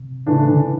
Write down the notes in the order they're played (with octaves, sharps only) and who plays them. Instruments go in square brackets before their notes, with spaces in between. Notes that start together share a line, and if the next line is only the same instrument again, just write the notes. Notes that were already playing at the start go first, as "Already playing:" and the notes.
Already playing: [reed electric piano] C3
[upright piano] A2 E3 A3 D4 [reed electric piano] C#3
[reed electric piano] D3